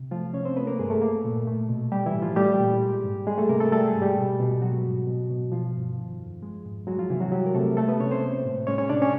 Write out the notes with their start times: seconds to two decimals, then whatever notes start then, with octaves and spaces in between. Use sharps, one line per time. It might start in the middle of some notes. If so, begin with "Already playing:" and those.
Already playing: C3
0.11 F3 A3 F4
0.33 C3 C#4 C#5
0.45 C4 C5
0.56 A3 B3 B4
0.67 A#3 A#4
0.79 G2 G#3 G#4
0.90 A3 A4
1.02 A#3
1.25 A#2
1.47 A3
1.69 B2
1.92 G3 G4
2.06 E3 E4
2.14 A2
2.22 F3 F4
2.36 G3 A3 G4
2.59 A#2
2.82 G#3
3.04 G#2
3.27 G3 G#3 G#4
3.38 A3 A4
3.49 C3 A#3 A#4
3.60 A3 A4
3.71 G3 A3 A4
3.86 G#3 G#4
3.95 G#2
4.02 G3 G4
4.17 B2
4.39 B2
4.62 F#3 G#3 F#4
4.85 G#2
5.07 B2
5.30 B2
5.52 F3 F4
5.75 G2
5.97 D#3
6.20 F2
6.43 G#3
6.65 G#2
6.87 F#3 G#3 F#4
6.98 F3 F4
7.10 C3 E3 E4
7.21 F#3 F#4
7.32 F#3 G3 G4
7.46 A#4
7.54 C3 A3 A4
7.77 G#3 A3 A4
7.88 B3 B4
8.00 C3 C#4 C#5
8.11 C4 C5
8.22 A#3
8.45 A2
8.67 G#3 C#4 C#5
8.78 C#4 C#5
8.89 C3 D4 D5
9.02 C#4 C#5